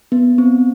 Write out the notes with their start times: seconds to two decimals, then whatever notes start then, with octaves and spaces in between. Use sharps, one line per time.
0.12 B3
0.38 C4